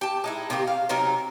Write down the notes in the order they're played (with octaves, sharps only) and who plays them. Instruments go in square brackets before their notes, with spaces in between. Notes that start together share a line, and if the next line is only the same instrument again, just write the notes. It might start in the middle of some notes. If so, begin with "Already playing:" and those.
[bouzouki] G4 A5
G#3 D#4 E4
C3 D#3 A#3 G4
F5
C3 F#3 D#4 A#4